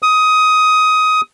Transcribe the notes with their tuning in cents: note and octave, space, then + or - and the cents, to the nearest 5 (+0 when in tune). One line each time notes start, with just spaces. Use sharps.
D#6 +15